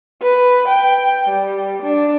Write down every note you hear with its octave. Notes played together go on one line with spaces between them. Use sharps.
B4
G5
G3
D4